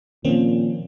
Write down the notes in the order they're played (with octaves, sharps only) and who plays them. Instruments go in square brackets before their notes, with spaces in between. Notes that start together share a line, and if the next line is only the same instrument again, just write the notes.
[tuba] A#2 [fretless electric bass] D#3 F3 [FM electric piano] A#3 C4 C#4